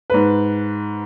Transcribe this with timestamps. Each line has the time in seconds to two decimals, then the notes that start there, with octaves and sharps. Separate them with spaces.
0.10 G#2 B4